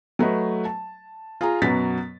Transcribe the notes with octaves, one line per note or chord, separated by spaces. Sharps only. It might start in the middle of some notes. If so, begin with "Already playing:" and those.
F#3 A3 B4 D#5
A5
F4 G#4 F5 G#5 A#5
F#2 B2 F#3 B4 A6 B6